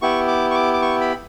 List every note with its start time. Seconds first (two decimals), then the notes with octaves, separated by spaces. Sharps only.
0.02 B3 E4 G4 C#6
0.28 D6
0.51 C#6
0.55 D6
0.74 D6
0.82 C#6
1.01 B5